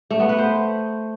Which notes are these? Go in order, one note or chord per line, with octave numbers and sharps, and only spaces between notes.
A3
B3
B4
C5